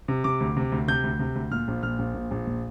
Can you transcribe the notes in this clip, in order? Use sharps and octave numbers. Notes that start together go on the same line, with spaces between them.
C3
C3 D6
D2
C3
D2
C3 G6
D2
C3
D2
A#2 F6
A#1
A#2 F6
A#1
A#2
A#1
A#2